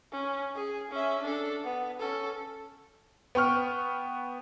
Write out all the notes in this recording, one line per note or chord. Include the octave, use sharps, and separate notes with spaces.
C#4
G#4
C#4 E5
D4 A4
B3
C#4 A4
B3 G5 C#6 F6